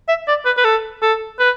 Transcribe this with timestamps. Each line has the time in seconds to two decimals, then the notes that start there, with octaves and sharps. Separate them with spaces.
0.08 E5
0.28 D5
0.45 B4
0.57 B4
0.64 A4
1.02 A4
1.39 B4